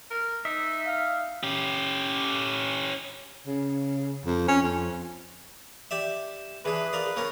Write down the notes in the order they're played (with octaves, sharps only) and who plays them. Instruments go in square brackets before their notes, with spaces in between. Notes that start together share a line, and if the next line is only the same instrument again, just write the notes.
[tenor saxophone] A#4
[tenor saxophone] D#4 [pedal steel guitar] E5
[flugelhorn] F5
[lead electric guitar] C#4 G4
[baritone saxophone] C#3
F2
C#4
F2
[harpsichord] G4 D5 E5
[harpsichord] E3 D4 [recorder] G#4 [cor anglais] B4
[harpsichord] F4 A#4 D5
A#3 C#4 A#4